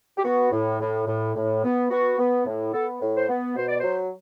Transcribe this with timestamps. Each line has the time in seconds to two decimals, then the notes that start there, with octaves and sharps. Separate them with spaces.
0.17 G4
0.24 B3 F#4
0.52 A2
0.80 A2
1.07 A2
1.36 A2
1.63 B3
1.91 B3 F#4
2.19 B3
2.46 A2
2.73 B3 A4
3.02 A2
3.15 C5
3.29 B3
3.56 B2 C5
3.68 D5
3.79 F#3 C5